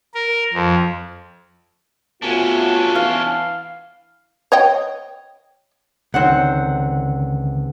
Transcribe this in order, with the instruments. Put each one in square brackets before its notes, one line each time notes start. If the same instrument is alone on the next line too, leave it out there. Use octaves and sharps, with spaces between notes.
[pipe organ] A#4
F2
[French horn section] C3 A3 B3 [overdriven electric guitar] C#4 D4 [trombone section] F4 F#4
[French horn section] E3 B3 [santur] F5
[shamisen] C#5 D#5 G5
[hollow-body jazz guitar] C#2 D3 D#3 [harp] C4 F#5